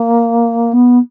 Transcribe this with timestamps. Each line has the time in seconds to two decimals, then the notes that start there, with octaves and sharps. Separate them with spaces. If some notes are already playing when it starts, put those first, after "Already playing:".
Already playing: A#3
0.73 B3